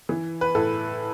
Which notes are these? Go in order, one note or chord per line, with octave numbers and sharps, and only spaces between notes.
E3
B4
A2 A4